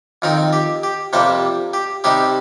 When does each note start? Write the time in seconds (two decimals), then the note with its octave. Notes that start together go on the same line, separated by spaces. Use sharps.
0.22 F2 D#3 C4 D#4 A#4
0.53 G4
0.83 G4
1.13 F2 C3 G3 A#3 C5
1.74 G4
2.04 C3 G3 C4 D#4 G4